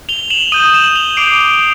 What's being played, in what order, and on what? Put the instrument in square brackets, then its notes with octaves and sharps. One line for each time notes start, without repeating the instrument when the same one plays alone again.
[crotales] F7 G7
E7 F#7
D#6 G6 D#7 F7
E7 F#7
F7 G7
D6 G6 C7 D7